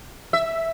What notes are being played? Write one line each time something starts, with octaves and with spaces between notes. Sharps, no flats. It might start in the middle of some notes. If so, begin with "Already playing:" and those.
E5